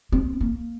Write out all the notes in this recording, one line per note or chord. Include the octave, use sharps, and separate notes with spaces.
C4
A#3